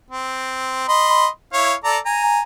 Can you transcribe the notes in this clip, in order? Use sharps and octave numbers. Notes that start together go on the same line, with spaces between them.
C4
D#5 B5 C6
E4 C#5 F5
A4 D5 A#5
G#5 A#5